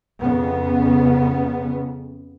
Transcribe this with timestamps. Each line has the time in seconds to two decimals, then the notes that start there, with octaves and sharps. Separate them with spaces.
0.22 F2 C#3 B3